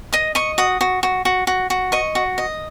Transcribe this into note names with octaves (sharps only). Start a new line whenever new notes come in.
D#5 D#6
D#5 C#6
F#4 D#6
F#4
F#4
F#4
F#4
F#4
D#5 C#6
F#4
D#5